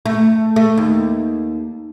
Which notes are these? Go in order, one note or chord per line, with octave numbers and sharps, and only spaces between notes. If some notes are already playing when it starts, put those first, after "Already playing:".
A3
A3
D#2